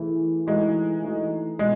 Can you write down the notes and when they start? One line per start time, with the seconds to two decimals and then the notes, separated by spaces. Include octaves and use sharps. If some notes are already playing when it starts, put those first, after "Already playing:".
Already playing: E3 A3 E4 G#4
0.47 E3 G#3 A3 D#4 F#4
1.02 E3 A3 D#4 F#4
1.59 B2 G#3 A3 E4 G#4